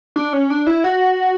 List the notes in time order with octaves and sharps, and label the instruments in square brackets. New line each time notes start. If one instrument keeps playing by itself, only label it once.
[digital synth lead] D4
C#4
D4
E4
F#4